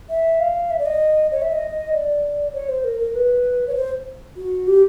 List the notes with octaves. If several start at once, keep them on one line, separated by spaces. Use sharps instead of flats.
E5
F5
E5
D5
D#5
C#5
E5
D#5
D5
C#5
C5
A#4
A#4
B4
C#5
C5
F#4
G4